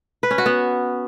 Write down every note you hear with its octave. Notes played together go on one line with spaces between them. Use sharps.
B4
C#4
F#4
B3